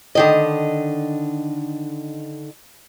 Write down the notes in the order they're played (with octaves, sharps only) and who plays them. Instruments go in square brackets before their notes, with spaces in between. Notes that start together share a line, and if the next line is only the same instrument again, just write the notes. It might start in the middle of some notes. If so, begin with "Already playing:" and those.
[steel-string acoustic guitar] D3 D#3 D#5